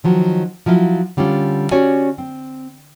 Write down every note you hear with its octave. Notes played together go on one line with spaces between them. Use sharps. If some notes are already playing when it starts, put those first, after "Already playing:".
D#3 F3 F#3
F3 F#3 E4 F4
D3 G3 C#4 D4 F4
C#4 F#4 G4 C#5 D5 G#5
C4